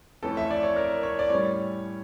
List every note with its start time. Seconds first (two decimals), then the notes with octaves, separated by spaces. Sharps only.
0.23 F2 E3 A3 C#4 A4
0.37 E5
0.50 D5
0.63 C#5
0.76 A#4
1.03 C#5
1.19 D5
1.30 A2 G3 C#4 C#5